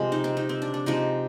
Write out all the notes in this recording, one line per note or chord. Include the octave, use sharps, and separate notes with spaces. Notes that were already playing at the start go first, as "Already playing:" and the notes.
Already playing: C3 F3 G#3
D#4
C4
D#4
C4
D4
D4
C3 F3 G#3 D#4